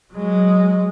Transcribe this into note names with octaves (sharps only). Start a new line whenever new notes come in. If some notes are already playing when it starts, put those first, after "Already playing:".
F#3 G#3